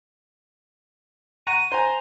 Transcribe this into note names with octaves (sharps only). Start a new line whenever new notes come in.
F#5 A#5 C#6 D#7
C5 G#5 A#5